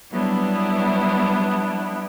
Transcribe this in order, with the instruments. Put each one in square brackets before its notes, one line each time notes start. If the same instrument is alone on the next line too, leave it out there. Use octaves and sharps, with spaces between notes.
[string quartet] F#3 G3 B3 D4 E4